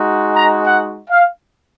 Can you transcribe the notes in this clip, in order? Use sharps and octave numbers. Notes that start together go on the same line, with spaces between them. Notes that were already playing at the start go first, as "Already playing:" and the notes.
Already playing: G#3 D#4 F#4
A#5
F#5
F5